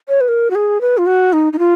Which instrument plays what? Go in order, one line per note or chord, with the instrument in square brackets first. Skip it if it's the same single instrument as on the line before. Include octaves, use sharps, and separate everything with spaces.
[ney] C#5
B4
A#4
F#4
G#4
B4
F4
F#4
D#4
D#4
F4